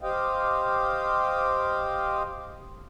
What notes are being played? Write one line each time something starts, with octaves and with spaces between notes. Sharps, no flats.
G4 C5 D#5 F5 G5